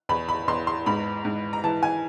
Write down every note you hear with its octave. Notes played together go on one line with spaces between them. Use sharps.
E2 B5
B5
E2 C6
C6
G#2 B5
G#2
A#5
E3 A5
G#5